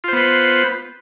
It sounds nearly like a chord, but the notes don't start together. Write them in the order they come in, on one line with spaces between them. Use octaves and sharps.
F4 C5 B3 B4